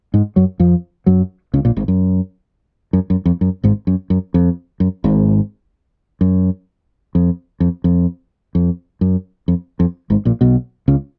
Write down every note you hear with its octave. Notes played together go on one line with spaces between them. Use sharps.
G#2 G#3
F#2 F#3
F2 F3
F#2 F#3
C#2 C#3
A#1 A#2
G#1 G#2
F#2
F#2
F#2
F2
F#2
G#1 G#2
F#2
F#2
F2
F#2
G#1 G#2
F#2
F2
F2
F2
F2
F#2
F2
F2
G#1 G#2
A#1 A#2
B1 B2
C#2 C#3